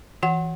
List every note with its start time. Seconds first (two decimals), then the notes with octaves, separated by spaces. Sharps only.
0.23 E3 F#4 F#5